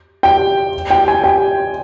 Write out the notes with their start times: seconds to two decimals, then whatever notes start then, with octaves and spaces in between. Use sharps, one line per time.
0.23 G5
0.90 G5
1.08 G#5
1.24 G5